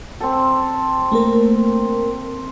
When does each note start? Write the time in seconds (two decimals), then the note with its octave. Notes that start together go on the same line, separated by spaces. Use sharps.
0.20 C4 A4
1.12 A3 A#3 A#4